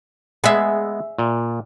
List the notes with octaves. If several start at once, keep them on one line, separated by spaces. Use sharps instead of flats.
G#3 B3 G#4 E5
A#2